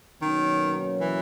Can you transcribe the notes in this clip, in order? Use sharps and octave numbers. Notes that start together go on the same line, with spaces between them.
B2 D#3 F#3 A#3 C#4
E3